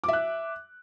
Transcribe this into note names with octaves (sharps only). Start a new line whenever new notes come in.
E5 D6 F#6